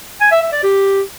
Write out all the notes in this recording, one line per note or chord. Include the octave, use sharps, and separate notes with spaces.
G#5
E5
E5
D5
G4